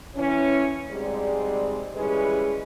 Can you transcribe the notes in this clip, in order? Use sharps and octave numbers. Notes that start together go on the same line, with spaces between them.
E3 C#4
G#2 G3 G#3 C4 D5
E3 G3 G#3 C#4 G#4 B4